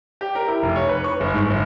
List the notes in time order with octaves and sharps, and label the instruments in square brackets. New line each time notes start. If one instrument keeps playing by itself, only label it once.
[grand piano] G4
A#4
E4
F1
C#5
B4
C#6
G1
G#2
G1